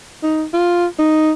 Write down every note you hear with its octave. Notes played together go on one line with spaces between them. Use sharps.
D#4
F4
D#4